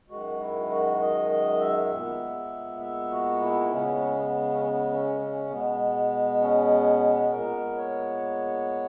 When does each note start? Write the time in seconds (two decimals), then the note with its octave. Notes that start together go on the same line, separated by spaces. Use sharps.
0.10 F#2 D#3 G#3 F#4
0.40 E4
0.70 F#4
1.01 D#5
1.30 D#5
1.60 E5
1.90 A#2 G#3 B3
2.81 E5
3.11 F#4
3.41 E4
3.71 C#3 G#3 B3 C#4
4.15 B3
4.51 C#4
4.61 B3
4.91 C#4
5.21 C#4
5.50 B2 G#3 B3
6.41 C#4
7.32 A#2 G#3 B3 A#4
7.77 C#5